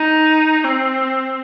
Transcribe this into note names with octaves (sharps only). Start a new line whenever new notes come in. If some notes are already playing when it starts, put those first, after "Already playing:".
Already playing: D#4
C4